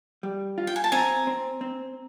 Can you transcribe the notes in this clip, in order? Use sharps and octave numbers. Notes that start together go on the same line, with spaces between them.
G3
F4
G5
G#5
A5
C4 G#5 A#5
C4
C4